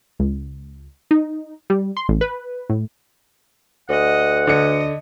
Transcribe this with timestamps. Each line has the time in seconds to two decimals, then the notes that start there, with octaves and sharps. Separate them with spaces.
0.19 C#2
1.11 D#4
1.70 G3
1.97 C6
2.09 A1
2.21 B4
2.70 A2
3.89 D2 D#5 F#5
4.47 D3 D#5 C#7